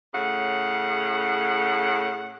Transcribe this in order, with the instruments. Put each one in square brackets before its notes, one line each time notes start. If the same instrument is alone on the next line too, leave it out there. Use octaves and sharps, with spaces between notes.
[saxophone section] A2 C#3 F#5